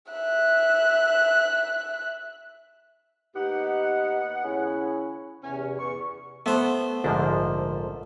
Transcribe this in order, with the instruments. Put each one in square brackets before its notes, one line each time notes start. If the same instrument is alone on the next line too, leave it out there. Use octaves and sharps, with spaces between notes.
[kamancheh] E5 F#6
[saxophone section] D#2 B3 F#5 [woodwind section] D#4 G4
[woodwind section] C#3 C#4 E4
[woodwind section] E2 C3 [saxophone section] C#4
[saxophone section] E2 [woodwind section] C#6
[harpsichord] A3 C5 [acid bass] B3
[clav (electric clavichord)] A#1 G#2 F3 [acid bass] D3